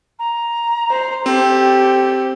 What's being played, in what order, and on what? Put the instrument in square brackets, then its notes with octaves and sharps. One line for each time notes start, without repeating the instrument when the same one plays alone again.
[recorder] A#5
[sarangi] C5
[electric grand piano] C4 [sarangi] G4 [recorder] A4